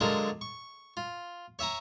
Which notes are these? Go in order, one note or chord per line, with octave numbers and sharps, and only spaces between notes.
D3 F#3 G#3 F4 A#4 A5
C#6
F4
C#5 E5 G#5 A#5